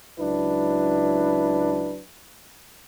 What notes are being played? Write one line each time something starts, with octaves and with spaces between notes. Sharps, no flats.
C#2 F#3 D4 E4 B4